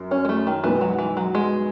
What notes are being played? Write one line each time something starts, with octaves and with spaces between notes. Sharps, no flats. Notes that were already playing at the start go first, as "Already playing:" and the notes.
Already playing: F#2
C#4
G#3
A3
D#3
B1 B2 E3 G#3 B3
F#3
E3
F#3
G#3